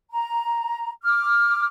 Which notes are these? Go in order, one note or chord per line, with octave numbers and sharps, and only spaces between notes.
A#5
D6 F6